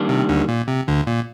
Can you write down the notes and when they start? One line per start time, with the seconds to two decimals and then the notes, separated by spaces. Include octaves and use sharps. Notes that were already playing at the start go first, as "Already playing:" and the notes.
Already playing: D#3 G3 A#3 D4
0.09 C3
0.29 D2 D3
0.48 A#2
0.68 C3
0.88 D2 D3
1.07 A#2